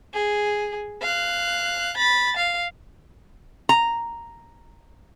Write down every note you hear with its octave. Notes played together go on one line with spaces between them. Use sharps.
G#4
F5 F#6
B5 A6
F5
A#5